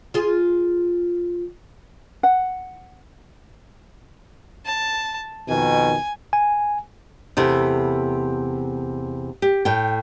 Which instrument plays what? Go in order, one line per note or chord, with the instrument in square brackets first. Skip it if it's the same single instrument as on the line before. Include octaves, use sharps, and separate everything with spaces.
[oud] F4 G#4
[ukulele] F#5
[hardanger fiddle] A5
[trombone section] F2 B2 D#3 [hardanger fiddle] G#5
[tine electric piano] G#5
[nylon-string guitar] E2 C3 A3 E4
G4
A2 G5